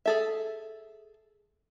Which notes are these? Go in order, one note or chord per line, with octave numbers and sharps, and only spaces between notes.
G#4 A4 E5